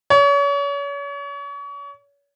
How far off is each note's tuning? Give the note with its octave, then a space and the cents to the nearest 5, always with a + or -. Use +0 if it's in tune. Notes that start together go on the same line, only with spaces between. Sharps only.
C#5 +35